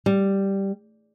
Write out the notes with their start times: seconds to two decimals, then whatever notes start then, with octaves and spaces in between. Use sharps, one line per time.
0.06 G3